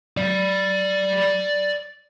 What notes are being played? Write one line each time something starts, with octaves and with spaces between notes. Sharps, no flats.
D5 B5